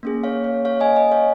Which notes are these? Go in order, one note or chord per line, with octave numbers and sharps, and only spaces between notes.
A#3 C#4 G#4
C#5 F5
C#5
C#5 F5
D#5 G#5
D#5 G#5
C#5 F5